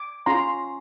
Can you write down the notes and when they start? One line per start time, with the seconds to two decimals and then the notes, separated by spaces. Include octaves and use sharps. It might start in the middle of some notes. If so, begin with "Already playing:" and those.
Already playing: D6
0.26 C#4 F4 G#4 A#5 C6